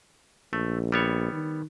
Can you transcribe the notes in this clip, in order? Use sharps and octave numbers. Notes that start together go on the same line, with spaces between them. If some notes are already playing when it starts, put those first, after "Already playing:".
A#1 A3
G3 B3 C#5
D#3